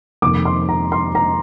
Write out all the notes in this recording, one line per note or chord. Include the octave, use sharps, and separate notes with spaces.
F2 C3 D#3 A#3 D6
C6
A#5
C6
A#5